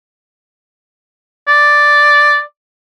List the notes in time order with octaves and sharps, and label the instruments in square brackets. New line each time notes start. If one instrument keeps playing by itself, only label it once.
[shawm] D5